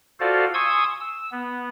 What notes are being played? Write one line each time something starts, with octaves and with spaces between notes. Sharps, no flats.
F4 F#4 A4 C5 D5 F5
G#5 C6 C#6 D#6 E6 G#6
E6
B3